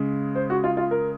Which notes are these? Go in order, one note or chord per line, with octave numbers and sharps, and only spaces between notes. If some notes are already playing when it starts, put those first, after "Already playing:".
Already playing: C#3 G#3
C5
F#4
F4
F4
A#4